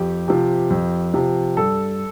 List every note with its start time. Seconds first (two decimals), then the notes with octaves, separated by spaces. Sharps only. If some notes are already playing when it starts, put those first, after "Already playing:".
Already playing: F2 G4
0.28 C3 F3
0.71 F2
1.14 C3 F3
1.57 G2 A4